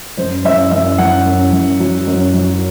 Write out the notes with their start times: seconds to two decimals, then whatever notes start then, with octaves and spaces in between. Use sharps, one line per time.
0.17 F#2 C5
0.45 F#2 E5
0.71 F#2 E5
0.98 F#2 F#5
1.26 F#2
1.52 F#2
1.80 F#3
2.07 F#2
2.34 F#3